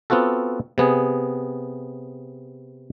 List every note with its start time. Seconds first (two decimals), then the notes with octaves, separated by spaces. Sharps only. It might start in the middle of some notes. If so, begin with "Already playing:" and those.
0.10 B3 C4 F4 F#4 A4
0.78 C3 B3 G#4